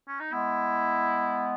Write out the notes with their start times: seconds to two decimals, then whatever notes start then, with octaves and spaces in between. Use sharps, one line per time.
0.08 C#4
0.20 D#4
0.32 G#3 B3 E4